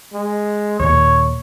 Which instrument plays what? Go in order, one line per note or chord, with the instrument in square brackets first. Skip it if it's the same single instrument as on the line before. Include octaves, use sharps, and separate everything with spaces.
[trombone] G#3
[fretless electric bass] D#2 A#2 [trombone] C#5